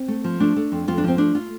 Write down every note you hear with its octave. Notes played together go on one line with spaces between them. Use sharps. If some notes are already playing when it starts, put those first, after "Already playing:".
Already playing: C4
A3
F3
A3 D4
A3
F2
F2 F4
D4
F3 C4
A3 D4
F4